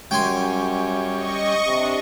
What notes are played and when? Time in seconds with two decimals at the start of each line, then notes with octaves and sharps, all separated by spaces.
0.11 F#2 G3 C#4 G5 G#5 C6
1.14 D#5 C#6
1.67 C3 D4